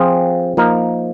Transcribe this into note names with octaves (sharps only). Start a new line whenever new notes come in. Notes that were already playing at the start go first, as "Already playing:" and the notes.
Already playing: F3 C4 F4 G#4
F3 A#3 D#4 A#4